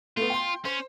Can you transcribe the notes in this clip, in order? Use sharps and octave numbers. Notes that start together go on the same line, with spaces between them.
A3 B3 F4
G5 C6
C#4 C5